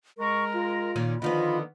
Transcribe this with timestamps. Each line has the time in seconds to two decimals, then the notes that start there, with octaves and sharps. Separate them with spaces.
0.19 G#3 A#4 C#6
0.54 F4
0.96 A#2 D#3 C#4
1.22 D3 D#3 F3 B3 F4 D#5 B5